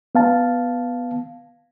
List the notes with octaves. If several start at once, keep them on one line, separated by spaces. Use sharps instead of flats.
B3 F5 A5